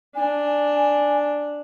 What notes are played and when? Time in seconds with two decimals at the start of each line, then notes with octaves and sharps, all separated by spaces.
0.15 D4 G#5